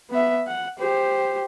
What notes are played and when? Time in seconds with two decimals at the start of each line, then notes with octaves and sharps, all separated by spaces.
0.10 B3 E5
0.47 F#5
0.80 G4 C5